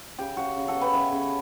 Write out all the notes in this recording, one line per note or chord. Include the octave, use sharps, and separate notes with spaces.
C#3 G4
C#3 F#4
C#3
F#4 A4
B3
G4 B4
C#3 C#5 E5
C#3